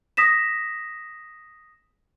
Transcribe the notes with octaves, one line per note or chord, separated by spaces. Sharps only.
D#6 A#6 B6 E7